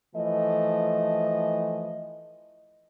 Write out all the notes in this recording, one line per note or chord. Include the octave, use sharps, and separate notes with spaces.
E3 F3 A3 D#5